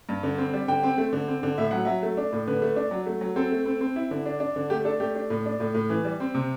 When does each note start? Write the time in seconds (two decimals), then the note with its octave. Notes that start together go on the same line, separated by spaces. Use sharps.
0.09 G2
0.23 D3
0.38 C4
0.54 G3
0.68 D3 G5
0.83 C4
0.98 A3
1.13 D3
1.28 C4
1.43 D3
1.58 A2 E5
1.71 F#3 F#5
1.85 F#3 E5
2.03 A3
2.17 D4
2.33 A2
2.47 D3 B4
2.62 A3
2.76 D4
2.91 F#3
3.06 A3
3.21 F#3
3.36 C4 A4
3.52 A3
3.66 C4
3.81 C4
3.96 E4
4.11 D3
4.26 D4
4.40 D4
4.56 D3
4.70 A3 G4
4.85 D4 A4
5.00 A3 G4
5.15 D4
5.30 A2
5.46 D4
5.60 A2
5.74 A2
5.89 E3
6.05 G3
6.20 C4
6.34 C3